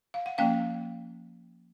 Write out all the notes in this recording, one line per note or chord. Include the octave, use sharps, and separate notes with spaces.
F5
F#5
F3 A#3 C#4 F5 G5